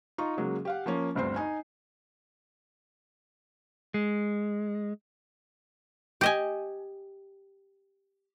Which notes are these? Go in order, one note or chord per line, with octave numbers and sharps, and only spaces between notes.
D#4 F4 A#5 C#6
C#3 F#3 G#3 A#3 F#4
G4 F5 F#5
F3 A#3 C#4
G1 D2 G2 C4 C5 C7
D#4 G#5
G#3
G4 D#5 G#5